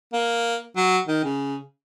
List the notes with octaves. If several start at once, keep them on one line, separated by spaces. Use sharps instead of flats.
A#3
F#3
D#3
C#3